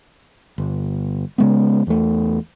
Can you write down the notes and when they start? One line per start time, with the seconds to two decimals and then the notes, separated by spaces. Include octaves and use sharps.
0.58 G1
1.38 C#3 G#3 B3
1.87 E2 A3